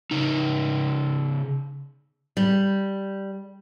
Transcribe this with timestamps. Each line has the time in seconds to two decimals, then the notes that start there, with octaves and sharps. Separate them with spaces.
0.11 C#3 D#4
2.37 G3